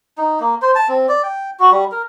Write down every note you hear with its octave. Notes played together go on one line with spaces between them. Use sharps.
D#4
A#3
C5
A5
C4
D5
G5
F#4
G3
A#4